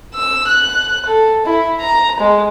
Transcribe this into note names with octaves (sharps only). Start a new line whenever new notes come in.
E6
F#6
A4
E4
A#5
G#3